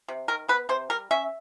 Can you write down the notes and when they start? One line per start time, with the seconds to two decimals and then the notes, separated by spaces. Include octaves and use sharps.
0.08 C3
0.28 D#3 A#4
0.48 B3 B4
0.69 C3 C5
0.90 G3 A#4
1.11 C#4 E5